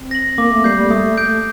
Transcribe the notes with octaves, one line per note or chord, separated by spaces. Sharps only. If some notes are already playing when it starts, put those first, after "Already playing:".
Already playing: C4
A#6 F#7
A#3 D6
A3
G3 G6 C7
G3
A3 D#6
G6 D7